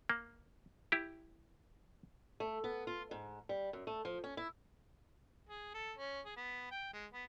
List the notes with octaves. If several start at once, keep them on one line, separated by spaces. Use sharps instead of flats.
A#3
E4 G4
A3
B3
F4
G#2
G3
F#2
A3
F3
C#4
E4
G#4
A4
C#4
G#4
B3
G5
G#3
B3